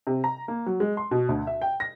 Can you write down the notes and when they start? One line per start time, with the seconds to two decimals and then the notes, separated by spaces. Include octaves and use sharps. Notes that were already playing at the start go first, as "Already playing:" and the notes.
0.07 C3
0.24 A#5
0.48 A#3
0.66 F#3
0.80 G#3
0.97 C6
1.11 B2
1.29 D2
1.47 E5
1.62 G5
1.80 A#6